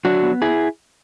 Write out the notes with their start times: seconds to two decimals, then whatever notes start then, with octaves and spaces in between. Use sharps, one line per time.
0.05 F#3 D4 F#4
0.23 B3
0.42 E4 G#4